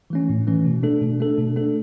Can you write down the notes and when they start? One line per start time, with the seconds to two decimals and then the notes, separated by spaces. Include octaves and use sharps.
0.10 E3 A3 C#4
0.29 A2
0.47 E3 A3 C#4
0.65 B2
0.83 A3 D4 A4
1.01 B2
1.20 A3 D4 A4
1.38 B2
1.56 A3 D4 A4